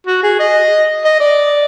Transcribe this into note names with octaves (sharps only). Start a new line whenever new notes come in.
F#4
G#4
D#5
D#5
D5